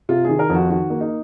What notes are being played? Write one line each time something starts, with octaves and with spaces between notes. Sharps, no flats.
C3 F4
D#3 G#4
A#4
F2 F#4
D#3 F#4
A#3
D#4